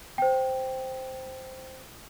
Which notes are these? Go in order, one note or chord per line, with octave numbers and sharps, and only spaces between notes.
C5 G5